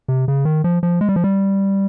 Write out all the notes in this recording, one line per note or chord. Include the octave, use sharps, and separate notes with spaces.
C3
C#3
D#3
F3
F3
G#3
G3
F3
G3